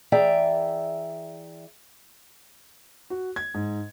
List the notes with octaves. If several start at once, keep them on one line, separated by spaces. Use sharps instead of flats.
E3 G#4 D5 E5 G5 A#5
F#4
G#6
G#2